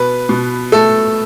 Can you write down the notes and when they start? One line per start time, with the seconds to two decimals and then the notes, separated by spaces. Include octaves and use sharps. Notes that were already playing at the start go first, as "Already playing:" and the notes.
Already playing: B2 B4
0.29 B2
0.72 A3 A4